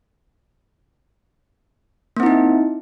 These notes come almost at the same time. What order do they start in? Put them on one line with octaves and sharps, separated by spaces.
A#3 C4 E4 D#4